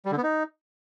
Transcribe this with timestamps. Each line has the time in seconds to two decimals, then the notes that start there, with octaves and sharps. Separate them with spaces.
0.05 G3
0.11 D3
0.17 B3
0.23 D#4